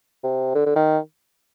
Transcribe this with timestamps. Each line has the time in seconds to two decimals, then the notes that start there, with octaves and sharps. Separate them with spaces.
0.23 C3
0.55 D3
0.66 D3
0.76 D#3